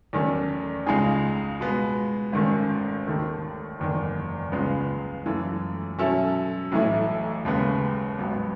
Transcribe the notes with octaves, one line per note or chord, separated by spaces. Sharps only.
E2 D#3 F#3 A3 C#4
C#2 C#3 G#3 D#4 G#4
B2 G#3 B3
G#1 G#2 D#3 A3 C#4
D#2 D#3 A3
F#1 E2 D#3
C#2 C#3 G#3 B3
F#2 E3 A3
B2 F#3 C#4 E4 A4
B1 A2 E3 A3 E4
D#2 C#3 G#3 B3
A1 G#2 F#3 B3